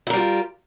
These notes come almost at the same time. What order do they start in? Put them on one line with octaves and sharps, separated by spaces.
E4 A#4 G3 F4